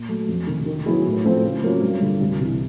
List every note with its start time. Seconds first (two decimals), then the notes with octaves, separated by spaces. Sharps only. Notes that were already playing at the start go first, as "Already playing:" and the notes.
Already playing: A#2
0.09 F#3 A3
0.29 F2
0.47 C3 D#3
0.66 D#3
0.86 F#3 B3 E4 G#4
1.06 A2
1.24 F3 A3 C4 F4
1.43 C#3
1.63 F#3 A#3 C#4 F4
1.81 G2
2.00 D3 G3
2.20 C2
2.39 C3 E3